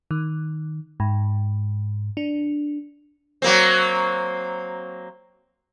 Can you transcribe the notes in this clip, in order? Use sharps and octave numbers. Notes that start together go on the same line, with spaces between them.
D#3
G#2
D4
F#3 A#3 C4